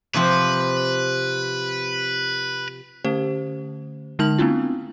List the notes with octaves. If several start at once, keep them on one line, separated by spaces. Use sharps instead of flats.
C3 F3 C4 B4
D3 A3 C#4 G4 C5
D3 G#3 D#4 A5 F6 F#7
A3 B3 C4 D4 E4 F4